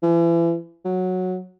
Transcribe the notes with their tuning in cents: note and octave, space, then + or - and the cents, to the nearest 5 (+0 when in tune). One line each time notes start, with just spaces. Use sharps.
E3 +35
F#3 -10